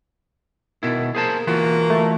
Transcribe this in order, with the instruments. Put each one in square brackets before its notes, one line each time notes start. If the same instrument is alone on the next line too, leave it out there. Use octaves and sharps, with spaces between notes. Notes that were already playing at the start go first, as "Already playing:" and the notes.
[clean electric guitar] B2 E4 [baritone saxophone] D#3
[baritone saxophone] A#3 [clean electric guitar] G#4 C5 A5
[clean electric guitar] E3 F4 F#4 [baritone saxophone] A#3
[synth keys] A3